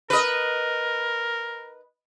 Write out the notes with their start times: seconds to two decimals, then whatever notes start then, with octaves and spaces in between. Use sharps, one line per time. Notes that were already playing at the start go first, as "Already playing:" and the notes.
0.10 A#4 B4 D#5